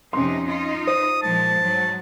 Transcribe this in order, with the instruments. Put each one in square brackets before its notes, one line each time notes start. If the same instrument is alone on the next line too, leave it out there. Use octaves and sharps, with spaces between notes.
[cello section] F2 C3 D#4 [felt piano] C#4 C6
[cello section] D#4 F4
[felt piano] C5 [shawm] D#6
[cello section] A#2 F3 G#3 [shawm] A5
[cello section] G#2 F#3